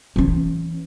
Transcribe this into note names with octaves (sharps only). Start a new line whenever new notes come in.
E3 C#4